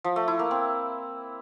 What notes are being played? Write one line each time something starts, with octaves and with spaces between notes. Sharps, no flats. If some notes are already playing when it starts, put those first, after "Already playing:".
F3
A3
E4
A#3
C4